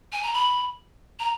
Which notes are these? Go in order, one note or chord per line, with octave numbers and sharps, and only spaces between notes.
G#5
A#5
B5
A#5